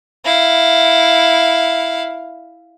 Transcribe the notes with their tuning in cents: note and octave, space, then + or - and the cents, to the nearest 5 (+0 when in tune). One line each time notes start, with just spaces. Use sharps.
E4 +0 F5 +0